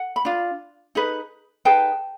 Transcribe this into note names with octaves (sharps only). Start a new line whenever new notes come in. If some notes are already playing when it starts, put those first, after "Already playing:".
Already playing: F#5
B5
D4 F4
D#4 G#4 B4
D#4 G#4 B4 G5 A5